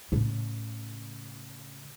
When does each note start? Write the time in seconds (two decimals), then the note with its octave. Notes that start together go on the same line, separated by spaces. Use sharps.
0.12 A2 C#3